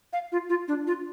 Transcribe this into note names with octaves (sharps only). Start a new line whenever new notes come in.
F5
F4
F4
D4
F4